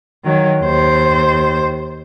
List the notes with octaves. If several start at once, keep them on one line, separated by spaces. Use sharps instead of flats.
D#3 F#3
D#2 C5